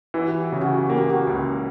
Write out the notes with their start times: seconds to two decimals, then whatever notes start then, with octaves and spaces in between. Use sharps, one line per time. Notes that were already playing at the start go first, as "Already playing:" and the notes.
0.14 E3 F#4
0.26 G4
0.38 F#4
0.50 C#3 G4
0.61 F#4
0.74 G4
0.86 A#3 F#4
0.97 G4
1.10 F#4
1.27 C#2